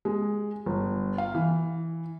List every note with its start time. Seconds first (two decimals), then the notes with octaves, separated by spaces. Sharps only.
0.05 G#3
0.66 G1
1.18 F5
1.34 E3